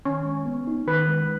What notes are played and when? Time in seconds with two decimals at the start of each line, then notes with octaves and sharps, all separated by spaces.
0.05 D#3 C#4
0.25 G#3
0.46 B3
0.67 D#4
0.87 D#3 B4
1.08 G#3